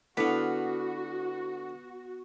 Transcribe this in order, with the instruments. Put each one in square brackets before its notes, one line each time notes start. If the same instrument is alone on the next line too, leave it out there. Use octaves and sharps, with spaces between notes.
[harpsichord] D3 [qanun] B3 F5 [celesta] E4 B6 [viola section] F#4